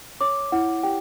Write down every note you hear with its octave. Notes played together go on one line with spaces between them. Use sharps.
C#5 D6
E4 F#5
G4 G5